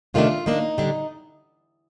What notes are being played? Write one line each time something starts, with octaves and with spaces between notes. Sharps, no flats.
C3 D#3 A3 D4 F4
D#3 A#3 D4 D#4
D3 G3 D4